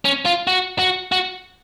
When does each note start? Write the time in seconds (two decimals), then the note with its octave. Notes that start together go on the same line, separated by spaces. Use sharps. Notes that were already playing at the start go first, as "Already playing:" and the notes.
0.05 C#4
0.25 F4
0.47 F#4
0.79 F#4
1.12 F#4